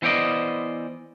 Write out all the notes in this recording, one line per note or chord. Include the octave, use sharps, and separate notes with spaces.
E3 B3 C5 D5 D#5